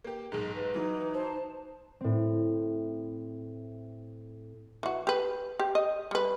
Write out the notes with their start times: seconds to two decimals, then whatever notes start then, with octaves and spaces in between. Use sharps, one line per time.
0.04 A#3 G4
0.32 B1 G#2 G#4
0.55 B4
0.75 E3 F#3 D#4
1.14 C5 A5
2.01 A2 C4
4.83 E3 F#4
5.07 G4 B4
5.59 G4
5.75 D#5
6.11 G3 B4